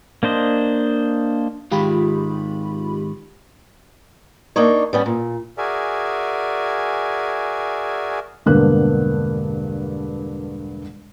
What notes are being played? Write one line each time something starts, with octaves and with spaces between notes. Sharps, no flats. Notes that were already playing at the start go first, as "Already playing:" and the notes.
A#3 D4 C5 D#5
G#2 D#3 G#3 F4 G4 B5
A#3 D4 D#4 C#5
G3 B3 C#4
A#2
F#4 G#4 A#4 D5 E5 G#5
E1 G2 D3 A#3 B3 F#6